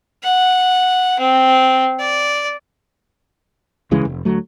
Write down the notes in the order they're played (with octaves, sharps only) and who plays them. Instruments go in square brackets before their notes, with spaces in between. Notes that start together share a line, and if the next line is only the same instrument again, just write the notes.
[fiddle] F#5
C4
D5
[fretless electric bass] D2 C#3 E3 G#3
F1
D2 F#3 A3